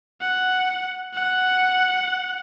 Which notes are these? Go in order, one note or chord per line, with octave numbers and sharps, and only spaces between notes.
F#5
F#5